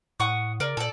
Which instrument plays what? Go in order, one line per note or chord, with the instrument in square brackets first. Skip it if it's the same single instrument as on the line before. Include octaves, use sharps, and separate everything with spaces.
[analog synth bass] A2 [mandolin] F#5 C#6 D#6
[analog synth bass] C#3 [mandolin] A#4 D5
[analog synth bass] A#2 [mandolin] A4 D5